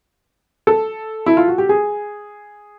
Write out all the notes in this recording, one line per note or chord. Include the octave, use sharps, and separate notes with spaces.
A4
E4
F4
F#4
G4
G#4